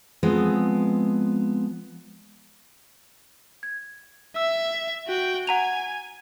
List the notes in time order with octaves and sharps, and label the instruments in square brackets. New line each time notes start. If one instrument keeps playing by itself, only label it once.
[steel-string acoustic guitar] F3 G#3 B3 C4
[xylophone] G#6
[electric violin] E5 [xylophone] E6
[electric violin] F#4 G5
[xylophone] F#5 A#5 F7 [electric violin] G#5